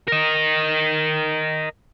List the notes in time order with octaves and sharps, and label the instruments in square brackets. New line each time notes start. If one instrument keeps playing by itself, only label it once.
[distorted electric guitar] A#4 D#5